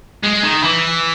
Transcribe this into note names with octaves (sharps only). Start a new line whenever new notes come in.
G#3
D#3
E3